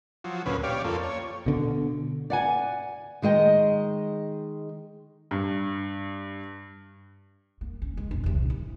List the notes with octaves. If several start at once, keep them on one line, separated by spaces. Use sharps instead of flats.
F3 F#3
D2 A#2 C#4 B4
G4 C#5 D5 F5
F2 A#3 F4 A4
C#5
B2 D3
D5 F#5 G#5
D#3 G#3 D#5 G5
G2
A#3
C#4
G#3
E1 A#1
C2 C3
E4